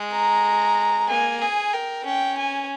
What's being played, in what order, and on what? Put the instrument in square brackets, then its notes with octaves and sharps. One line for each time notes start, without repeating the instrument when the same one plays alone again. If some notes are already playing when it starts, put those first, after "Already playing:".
Already playing: [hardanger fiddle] G#3
[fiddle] A#5
[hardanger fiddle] A#3 [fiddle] G#5
[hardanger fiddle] G#4 [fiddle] G#5
[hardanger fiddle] A#4 [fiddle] G5
[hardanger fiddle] C#4 [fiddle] G5
[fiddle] G#5